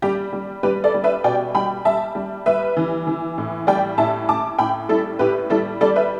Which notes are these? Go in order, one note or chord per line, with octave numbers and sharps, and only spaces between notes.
G3 G4
G3
G3 G4 B4
A4 D5
G3
B4 E5
B2 D5 G5
G3 G5 B5
G3 E5 A5
G3
G3 B4 E5
E3
E3
A2
G3 D5 G5
A2 E5 A5
A2 A5 D6
A2 G5 B5
G3 E4 A4
A2 G4 B4
G3 E4 A4
G3 A4 D5
B4 E5